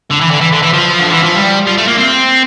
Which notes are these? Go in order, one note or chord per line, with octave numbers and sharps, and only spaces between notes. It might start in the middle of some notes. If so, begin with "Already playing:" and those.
D3
E3
D3
E3
D3
E3
F3
D3
E3
F3
G3
F3
A3
A#3
C4